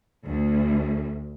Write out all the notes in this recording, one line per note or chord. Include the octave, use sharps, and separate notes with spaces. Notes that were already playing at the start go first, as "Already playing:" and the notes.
D2